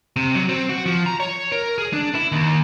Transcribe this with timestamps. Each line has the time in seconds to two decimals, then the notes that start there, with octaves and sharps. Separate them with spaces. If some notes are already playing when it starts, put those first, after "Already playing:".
0.16 C3
0.35 F#3
0.49 C4
0.69 F#4
0.86 F3
1.06 A#5
1.20 C#5
1.52 A#4
1.78 G#4
1.93 D4
2.15 E4
2.32 D#2